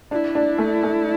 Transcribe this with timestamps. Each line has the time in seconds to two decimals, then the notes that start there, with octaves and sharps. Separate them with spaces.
0.11 D4 E4
0.35 D4
0.58 A3
0.83 A3